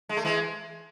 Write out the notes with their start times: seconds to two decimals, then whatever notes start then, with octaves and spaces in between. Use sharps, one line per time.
0.09 G#3
0.17 A3
0.24 E3 G#3